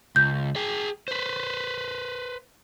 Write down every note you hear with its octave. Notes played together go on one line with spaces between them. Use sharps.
C#2 G6
G#4 G5
B4 C5